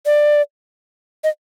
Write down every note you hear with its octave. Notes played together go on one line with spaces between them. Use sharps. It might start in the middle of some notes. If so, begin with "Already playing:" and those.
D5
D#5